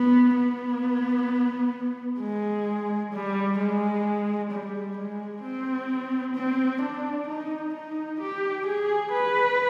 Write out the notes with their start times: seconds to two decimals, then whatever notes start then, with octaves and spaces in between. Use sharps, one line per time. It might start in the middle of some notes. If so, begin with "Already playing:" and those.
Already playing: B3
0.35 B3
2.20 G#3
3.13 G3
3.59 G#3
4.51 G3
4.97 G#3
5.43 C4
6.35 C4
6.82 D4
7.27 D#4
7.74 D#4
8.20 G4
8.66 G#4
9.12 B4